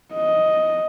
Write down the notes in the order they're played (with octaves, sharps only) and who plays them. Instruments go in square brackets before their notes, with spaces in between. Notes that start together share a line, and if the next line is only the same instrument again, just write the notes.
[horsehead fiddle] D#5